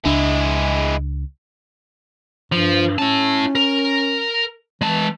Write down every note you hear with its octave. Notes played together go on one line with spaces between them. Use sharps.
C#2 G#3 D4 E4
G2 F3
C#4 E4 A5
A#4
E3 G#3 A5